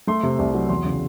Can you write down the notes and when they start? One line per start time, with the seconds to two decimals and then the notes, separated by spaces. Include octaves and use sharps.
0.07 A3 C6
0.23 C3
0.39 C2
0.54 F#3
0.69 E2 C6
0.85 C#3